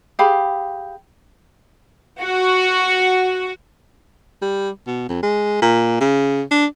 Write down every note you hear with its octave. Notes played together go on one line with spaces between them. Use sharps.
G4 G#4 F5 B5
F#4
G3
B2
F2
G#3
A#2
C#3
D4